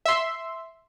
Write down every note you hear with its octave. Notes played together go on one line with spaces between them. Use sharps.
E5 C6